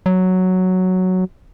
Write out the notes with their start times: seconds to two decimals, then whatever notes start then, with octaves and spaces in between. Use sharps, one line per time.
0.06 F#3